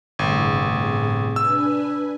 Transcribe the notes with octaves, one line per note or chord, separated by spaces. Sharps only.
G1 A2 C3 G#4
D4 B4 G#5 E6